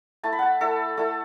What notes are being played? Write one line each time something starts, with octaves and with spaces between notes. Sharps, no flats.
A3 E4 A5
B5
F#5 A5
A3 E4 A4
A3 E4 A4